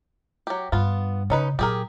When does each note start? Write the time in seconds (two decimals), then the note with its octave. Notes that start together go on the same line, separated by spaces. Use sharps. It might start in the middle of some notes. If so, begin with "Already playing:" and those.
0.47 F#3 G4
0.72 G2 B3 F4
1.30 C#3 C#4 D#4 B4
1.59 A#2 F#3 G4 G#4 A#4